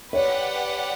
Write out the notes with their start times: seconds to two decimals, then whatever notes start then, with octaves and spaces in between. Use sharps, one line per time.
0.13 G4 B4 C#5 D5 F#5